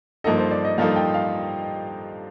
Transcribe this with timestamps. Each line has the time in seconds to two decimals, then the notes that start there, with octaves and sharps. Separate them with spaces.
0.24 G2 F3 A#3 D#4 A4 D#5
0.38 C5
0.51 D5
0.65 D#5
0.78 G2 F3 A#3 D#4 A4 F5
0.96 G5
1.14 F5